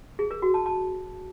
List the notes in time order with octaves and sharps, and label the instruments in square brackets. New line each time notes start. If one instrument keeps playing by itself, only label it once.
[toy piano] G#4
A#4
F#4
A5
A5